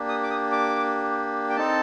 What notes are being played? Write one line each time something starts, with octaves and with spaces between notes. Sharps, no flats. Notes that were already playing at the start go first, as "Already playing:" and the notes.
Already playing: A#3 D4 G4
D#6
D6
D#6
D6
G5
C4 D#4 A4 A5